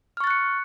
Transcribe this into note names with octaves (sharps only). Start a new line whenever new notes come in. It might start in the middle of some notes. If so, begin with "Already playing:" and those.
C#6 F6 F#6 A6 C#7